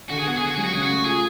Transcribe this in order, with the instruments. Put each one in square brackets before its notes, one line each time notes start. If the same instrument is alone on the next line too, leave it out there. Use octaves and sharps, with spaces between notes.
[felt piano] D3 [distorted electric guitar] F#4
[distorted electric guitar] G#4
[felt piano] B3 [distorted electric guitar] F#4
[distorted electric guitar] G#4
[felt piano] D3 [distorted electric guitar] F#4
[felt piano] F#3 [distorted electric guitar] G#4
[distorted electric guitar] F#4
[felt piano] C#3 [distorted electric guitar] G#4
[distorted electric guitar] F#4
[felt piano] A3
[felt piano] F4 [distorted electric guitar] G#4